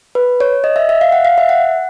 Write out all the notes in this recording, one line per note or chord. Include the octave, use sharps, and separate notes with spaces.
B4
C#5
D#5
E5
E5
F5
F#5
F5
E5
F#5